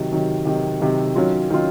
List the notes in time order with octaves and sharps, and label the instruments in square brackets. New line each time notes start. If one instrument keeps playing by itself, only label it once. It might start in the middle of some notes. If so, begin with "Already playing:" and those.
Already playing: [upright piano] C3 D#3 F#3
C3 D#3 F#3
C3 D#3 F#3
C3 D#3 F#3
D#3 F#3 C#4 F4
D#3 F#3 C#4 F4